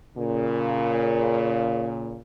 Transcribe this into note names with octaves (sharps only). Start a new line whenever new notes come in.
A#2 C#3